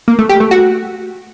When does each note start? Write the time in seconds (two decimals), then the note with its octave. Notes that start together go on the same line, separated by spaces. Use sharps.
0.08 A#3
0.19 A3
0.29 G4
0.40 A3
0.51 F#4